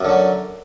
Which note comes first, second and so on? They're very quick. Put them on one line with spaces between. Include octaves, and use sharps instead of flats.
F#2 D3 F#3